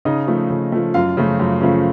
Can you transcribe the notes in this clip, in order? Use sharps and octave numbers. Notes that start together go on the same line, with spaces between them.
C#3 D#4 D#5
F3 A3
C#3
F3 A3
F#2 F4 F5
C#3 F3 A3
F#2
C#3 F3 A3